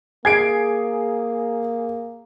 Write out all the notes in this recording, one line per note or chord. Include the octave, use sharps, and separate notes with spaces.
A#3 G#4 G#6 C7 D7